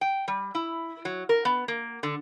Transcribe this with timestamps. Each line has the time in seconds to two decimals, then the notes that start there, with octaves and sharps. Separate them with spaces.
0.01 G5
0.28 G3
0.55 E4
1.05 F#3
1.29 A#4
1.45 B3
1.68 A#3
2.03 D3